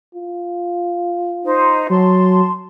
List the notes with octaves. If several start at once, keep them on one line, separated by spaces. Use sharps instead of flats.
F4
D#4 C5
F#3 A5 C6